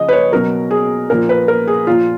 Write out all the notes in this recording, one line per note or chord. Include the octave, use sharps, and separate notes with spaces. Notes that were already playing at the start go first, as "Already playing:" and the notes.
Already playing: C#3 F3 D#5
B4
C#5
B2 F#3 A#4
G#4
A#2 F3 A#4
B4
A#4
G#4
A#2 F3 F4